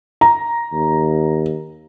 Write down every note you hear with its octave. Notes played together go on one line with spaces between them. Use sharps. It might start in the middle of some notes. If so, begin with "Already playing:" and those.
A#5
D#2